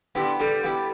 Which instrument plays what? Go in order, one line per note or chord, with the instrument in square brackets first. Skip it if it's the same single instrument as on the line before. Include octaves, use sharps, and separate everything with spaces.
[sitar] D3 [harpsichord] B3 E4 G4
[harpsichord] D3 [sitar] G3
[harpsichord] B3 E4 G4